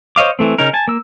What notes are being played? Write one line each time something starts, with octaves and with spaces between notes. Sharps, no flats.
C5 C#5 D#5 F5 D6
E3 A3 C4
C#3 C#4 D#4 A#4
G#5 A5
A#3 E6